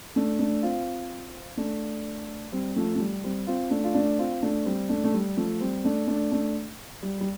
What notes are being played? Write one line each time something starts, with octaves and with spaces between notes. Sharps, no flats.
A3 D4
A3 D4
C4 F4
A3 D4
G3 C4
F3 A3
A3
G3
G3 C4
C4 F4
A3 D4
F4
A3 D4
C4 F4
A3 D4
G3 C4
A3 D4
A3
G3
F3 A3
G3 C4
A3 D4
A3 D4
A3 D4
G3
G3